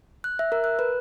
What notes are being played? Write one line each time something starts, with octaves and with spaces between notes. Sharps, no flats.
F#6
E5
A#4
F#6
B4